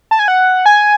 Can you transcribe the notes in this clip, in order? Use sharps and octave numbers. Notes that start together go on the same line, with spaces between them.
A5
G#5
F#5
G#5